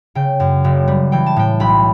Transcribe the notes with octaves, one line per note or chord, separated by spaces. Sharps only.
C#3 G5
F#2
F#1
G3
E3 G5
A5
A2 G5
B1 B5